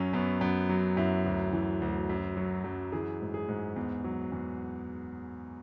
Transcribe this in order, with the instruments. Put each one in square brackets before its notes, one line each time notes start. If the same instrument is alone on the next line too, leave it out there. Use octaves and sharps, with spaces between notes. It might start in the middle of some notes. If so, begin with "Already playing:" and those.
Already playing: [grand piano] F#2 F#3 C#4
F#2 B3
F#2 B3
F#3
F#2 E4
D2
E3
D2
F#2
F#3
F#2
E3 G#4
G#2
G#4
G#2
E2
F#3
E2